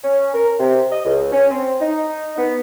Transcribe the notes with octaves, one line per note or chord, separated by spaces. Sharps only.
C#4
A#4
C3
D#5
C#2
C#4
C4
D#4
B3